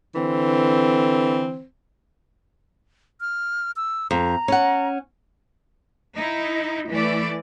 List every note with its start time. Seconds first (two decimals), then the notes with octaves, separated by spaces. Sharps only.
0.14 D3 E3 C4
3.21 F6
3.76 E6
4.11 F2 A#5
4.48 C#4 F#5
6.16 D#4 E4
6.88 E3 A3 D5